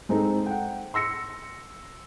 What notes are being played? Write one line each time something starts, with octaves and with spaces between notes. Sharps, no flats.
G#3 C4 D#4 A4
F#5 G5
C6 E6 A#6 C#7